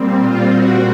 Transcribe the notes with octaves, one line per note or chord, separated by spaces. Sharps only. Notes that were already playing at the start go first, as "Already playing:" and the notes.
Already playing: A#2 G3 C4
F4
F#4